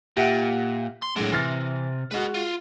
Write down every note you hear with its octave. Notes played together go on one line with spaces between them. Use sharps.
A#2 G4 E5 F#5
C6
A2 F#3 G#3 D4
C3 E3 F6 A6
G#3 F#4 B4 D#5
F4